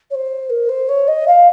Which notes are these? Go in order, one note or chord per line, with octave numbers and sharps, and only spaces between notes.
C#5
C5
A#4
C5
C#5
D#5
F5